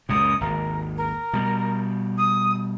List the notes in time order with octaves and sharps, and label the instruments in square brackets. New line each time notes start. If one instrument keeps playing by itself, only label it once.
[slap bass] C#2 F#2 A#2 [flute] D#6
[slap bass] G#1 D#2 [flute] A#4
[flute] A#4
[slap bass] B2 G3
[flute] D#6